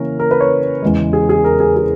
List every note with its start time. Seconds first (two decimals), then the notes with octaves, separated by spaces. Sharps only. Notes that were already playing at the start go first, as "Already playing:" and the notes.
Already playing: C#3 E3 A#3 C#4 A#4
0.19 A#4
0.31 B4
0.40 C#5
0.82 E2 C#3 G#3
1.13 G#4
1.29 G#4
1.44 A#4
1.60 G#4
1.76 G#4